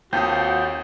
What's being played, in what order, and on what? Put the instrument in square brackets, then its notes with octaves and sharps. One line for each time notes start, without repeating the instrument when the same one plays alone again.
[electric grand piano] D#2 D#6 [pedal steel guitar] C4 F4 A4 [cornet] F#4 [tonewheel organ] G5